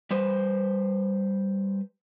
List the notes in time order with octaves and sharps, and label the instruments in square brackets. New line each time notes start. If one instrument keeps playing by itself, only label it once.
[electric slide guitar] G3 B4 C5